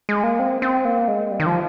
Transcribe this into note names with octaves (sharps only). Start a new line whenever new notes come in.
G#3
A#3
C4
C4
A#3
G#3
G3
D#3
F3